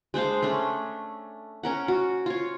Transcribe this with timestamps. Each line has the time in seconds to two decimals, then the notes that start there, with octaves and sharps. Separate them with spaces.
0.14 G#3 D4 C5 F5
0.42 A3 C#4 D4
1.63 C#4 A#4 F#5
1.88 F#4
2.26 F4 C#5